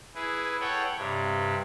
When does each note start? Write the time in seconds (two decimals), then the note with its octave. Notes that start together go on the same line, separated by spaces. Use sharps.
0.15 E4 G#4 B4
0.60 A4 C#5 F#5 G5
0.96 G2 C3